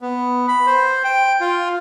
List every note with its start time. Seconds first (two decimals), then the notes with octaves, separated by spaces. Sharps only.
0.02 B3
0.48 B5
0.67 C5
1.04 G5
1.40 F4